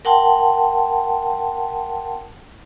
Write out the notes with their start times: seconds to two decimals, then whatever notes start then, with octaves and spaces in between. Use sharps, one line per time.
0.05 A#4 F#5 G5 A5 C6